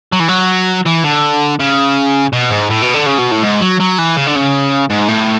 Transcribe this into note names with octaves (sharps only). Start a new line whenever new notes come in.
F#3
E3
F#3
E3
D3
C#3
B2
G#2
A2
B2
D3
C#3
B2
A2
G#2
F#3
F#3
E3
C#3
D3
C#3
G#2
A2